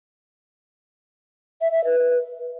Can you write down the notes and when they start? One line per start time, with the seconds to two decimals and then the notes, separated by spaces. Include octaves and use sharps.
1.61 E5
1.73 E5
1.85 B4